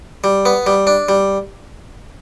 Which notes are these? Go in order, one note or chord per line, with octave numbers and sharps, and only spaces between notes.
G3
B3
G3
D4
G3